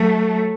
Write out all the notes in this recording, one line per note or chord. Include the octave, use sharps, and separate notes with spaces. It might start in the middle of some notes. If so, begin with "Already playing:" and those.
Already playing: F#3 A3